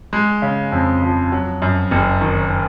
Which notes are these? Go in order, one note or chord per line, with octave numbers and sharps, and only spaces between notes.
G#3
C#3
F2
F3
F#3
F#2
F#1
D#3